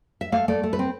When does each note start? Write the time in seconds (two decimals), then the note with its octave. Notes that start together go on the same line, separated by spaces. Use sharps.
0.21 E5
0.32 A3 F5
0.48 A3 D5
0.63 A3
0.73 B4
0.79 C4